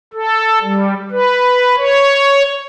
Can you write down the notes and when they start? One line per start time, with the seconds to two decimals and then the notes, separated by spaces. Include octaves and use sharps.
0.13 A4
0.62 G3
1.11 B4
1.77 C#5